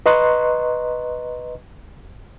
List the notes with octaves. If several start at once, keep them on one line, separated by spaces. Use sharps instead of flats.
B4 D#5 A#5 C6 C#6 F#6